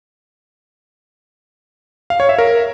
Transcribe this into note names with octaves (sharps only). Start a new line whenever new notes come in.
F5
C#5
E5
A#4